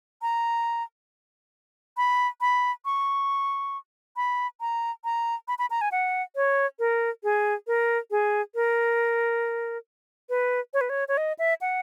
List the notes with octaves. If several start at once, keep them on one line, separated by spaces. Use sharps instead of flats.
A#5
B5
B5
C#6
B5
A#5
A#5
B5
B5
A#5
G#5
F#5
C#5
A#4
G#4
A#4
G#4
A#4
B4
C#5
B4
C#5
C#5
D#5
E5
F#5